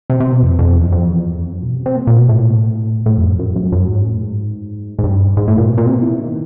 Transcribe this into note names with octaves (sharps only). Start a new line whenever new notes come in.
C3
C3
B2
F2
F2
E2
F#2
F2
E2
F2
F#2
B2
C3
C3
A#2
A#2
B2
A2
A2
F2
F#2
F#2
F#2
F#2
G#2
A2
G#2
G#2
G2
G#2
A2
A#2
B2
A#2
C3
B2
E3
D#3